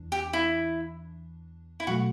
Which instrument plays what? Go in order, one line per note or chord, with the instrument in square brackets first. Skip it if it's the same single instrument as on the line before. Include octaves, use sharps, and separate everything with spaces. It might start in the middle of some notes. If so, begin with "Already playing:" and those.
Already playing: [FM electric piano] E2 E3 D4
[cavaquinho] G4
E4
E4
[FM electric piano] B2 F#3 A3 [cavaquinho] F#4